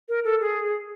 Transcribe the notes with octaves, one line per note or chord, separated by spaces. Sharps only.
A#4
A4
G#4